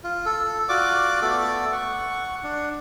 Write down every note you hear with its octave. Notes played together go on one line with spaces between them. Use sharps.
F4
A4
F4 F#4 D5 D6
A3 B3 A4 D5
F#5 C#6
D4